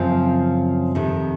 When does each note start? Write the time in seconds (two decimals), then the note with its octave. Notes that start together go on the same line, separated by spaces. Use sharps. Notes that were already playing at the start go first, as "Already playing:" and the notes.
Already playing: F#2 C#3 F3 C4
0.95 F2 C3 D#3